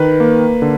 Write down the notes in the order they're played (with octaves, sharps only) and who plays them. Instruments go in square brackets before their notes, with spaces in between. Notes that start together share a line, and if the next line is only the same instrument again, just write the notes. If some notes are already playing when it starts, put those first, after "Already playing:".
Already playing: [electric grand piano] D#3 B4
A#3
D3